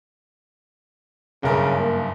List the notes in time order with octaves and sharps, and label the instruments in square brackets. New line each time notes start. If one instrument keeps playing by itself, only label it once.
[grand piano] F#1 G2 A#4 [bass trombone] C#3
[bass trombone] A#3